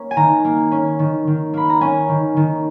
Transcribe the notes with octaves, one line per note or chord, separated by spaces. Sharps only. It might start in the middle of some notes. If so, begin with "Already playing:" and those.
Already playing: A#3 C#4
G#5
D#3 A#5
A#3
C#4
D#3
D#3
A#3 B5
A#5
C#4 G#5
D#3
D#3